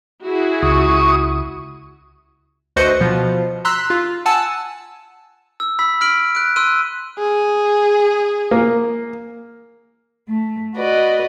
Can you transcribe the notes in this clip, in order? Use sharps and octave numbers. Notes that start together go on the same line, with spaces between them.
E4 F#4 G#4
C#2 C#6 D#6
D2 F#4 B4 C5 D#5 C#7
B2 F3
A#5 C6 E6 F#6 B6
F4
F#5 G#5 A5 E6
E6
B5 E6 B6
F6 B6 D7 F#7
F#6 D7
C6 E6 F#6 D#7
G#4
A#3
A3
F#4 B4 D5 D#5